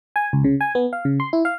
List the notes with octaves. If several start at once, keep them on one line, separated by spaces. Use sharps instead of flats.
G#5
C#2
C#3
G#5
B3
F5
C#3
C6
E4
F5